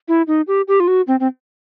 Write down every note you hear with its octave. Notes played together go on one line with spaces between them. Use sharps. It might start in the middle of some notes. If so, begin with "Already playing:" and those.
E4
D#4
G4
G4
F4
F#4
C4
C4